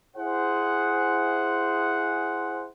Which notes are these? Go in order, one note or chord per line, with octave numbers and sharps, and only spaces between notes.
E4 G#4 C5 F#5